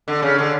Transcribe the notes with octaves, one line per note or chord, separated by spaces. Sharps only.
D3
C#3
D3